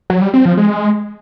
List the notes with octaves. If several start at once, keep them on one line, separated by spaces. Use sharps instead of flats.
F#3
G3
C4
F3
G#3